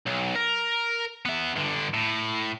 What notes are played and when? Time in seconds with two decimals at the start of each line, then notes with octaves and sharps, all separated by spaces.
0.07 B1
0.36 A#4
1.25 B3 E5
1.55 G2 D3
1.94 A2